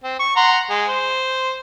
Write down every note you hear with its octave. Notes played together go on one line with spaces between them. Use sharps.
C4
C#6
F#5 A#5 C6
G#3
C5